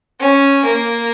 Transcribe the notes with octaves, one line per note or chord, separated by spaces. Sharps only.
C#4
A#3